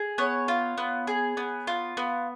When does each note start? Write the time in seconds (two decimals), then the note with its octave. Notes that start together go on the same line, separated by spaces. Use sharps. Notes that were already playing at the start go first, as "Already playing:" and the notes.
Already playing: G#4
0.18 B3 C#5
0.48 F4
0.78 B3
1.07 G#4
1.37 B3
1.67 F4
1.97 B3